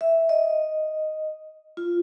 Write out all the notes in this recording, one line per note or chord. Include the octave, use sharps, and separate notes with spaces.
E5
D#5
F4